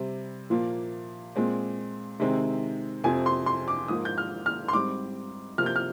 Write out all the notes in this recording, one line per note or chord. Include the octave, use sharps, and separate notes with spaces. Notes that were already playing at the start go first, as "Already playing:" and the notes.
Already playing: C3 G3 C4
A#2 F3 A#3
A#2 G#3 C4
C3 D#3 G#3 C4
F2 C3 F3 C4 G#5
C6
C6
D6
G#2 F3 A#3 D#6
G6
F6
F6
C6
G#2 G3 C4 D6
C3 F3 A#3 F6
G6
F6